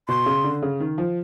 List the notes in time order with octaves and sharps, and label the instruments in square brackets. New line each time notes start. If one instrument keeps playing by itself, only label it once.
[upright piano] B2 [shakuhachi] C6
[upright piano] C#3
D3
C#3
D#3
F3